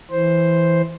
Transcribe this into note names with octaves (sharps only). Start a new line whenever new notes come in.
E3 C5